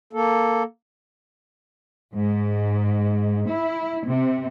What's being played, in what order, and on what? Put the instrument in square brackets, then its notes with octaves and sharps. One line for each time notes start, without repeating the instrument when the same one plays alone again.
[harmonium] A#3 A4
[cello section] G#2
E4
C3